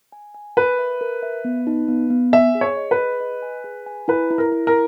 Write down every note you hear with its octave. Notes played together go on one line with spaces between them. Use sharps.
G#5
G#5
A#4 B4
E5
A#4
E5
B3
D#4
B3
B3
E5 G#5
G#4
C#5
D#5
B4
G#4
D#5
G#5
G#4
G#5
E4 B4
E4
A#4
E4
A#4